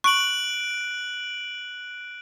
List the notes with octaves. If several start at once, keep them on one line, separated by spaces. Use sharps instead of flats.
C#6 F#6 D7 F#7